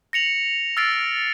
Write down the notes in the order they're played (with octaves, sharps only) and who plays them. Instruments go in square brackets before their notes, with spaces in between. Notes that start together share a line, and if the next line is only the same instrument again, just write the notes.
[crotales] A#6 C#7 F7 F#7
E6 F6 A6 C7 D7